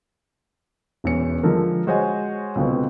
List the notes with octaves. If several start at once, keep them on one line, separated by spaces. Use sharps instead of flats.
E1 E2 C#4 C#7
D3 F3 G#3 A4 A#4
G#3 F#4 C5 C#5 D#5 G#5
C#2 B2 D3 C4